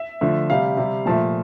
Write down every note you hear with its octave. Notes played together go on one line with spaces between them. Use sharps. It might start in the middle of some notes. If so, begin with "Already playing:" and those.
Already playing: E5
D3 F3 A3
C3 G3 F5
C3 G3
A#2 F3 A3 A5